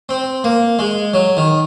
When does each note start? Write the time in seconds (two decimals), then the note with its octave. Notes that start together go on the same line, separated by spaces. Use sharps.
0.09 C4
0.44 A#3
0.79 G#3
1.14 F#3
1.37 D#3